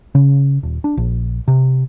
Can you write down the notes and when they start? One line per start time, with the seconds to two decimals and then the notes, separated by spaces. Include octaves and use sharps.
0.15 C#3
0.63 D#1
0.84 D4
0.97 A#1
1.48 C3